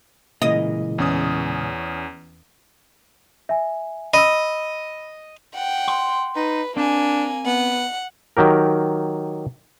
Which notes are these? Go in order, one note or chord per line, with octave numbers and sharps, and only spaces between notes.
A#2 C#3 E3 G#3 A#3 D#5
E2 C#4 D#6
E5 G#5
D#5 B5 E6
F#5 G5
C6
D#4 B4
A#3 C4 D4 G#5
B3 F#5
D#3 F#3 G4 A#4